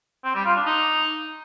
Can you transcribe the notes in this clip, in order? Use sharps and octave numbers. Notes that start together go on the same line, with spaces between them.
C4
G3
F4
D4
D#4